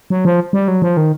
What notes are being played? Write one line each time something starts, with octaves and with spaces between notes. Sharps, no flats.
F#3
F3
G3
F#3
F3
D#3